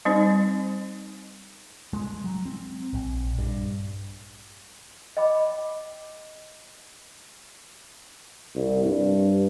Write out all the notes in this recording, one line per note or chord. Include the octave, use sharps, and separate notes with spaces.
G3 C4 D#4 C5
G#3
F#3
C4
A#1
G2
D#5 G5 B5 D6
C2
G2